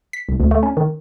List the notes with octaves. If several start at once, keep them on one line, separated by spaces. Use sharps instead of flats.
B6
C2
D2
A3
C#4
D#3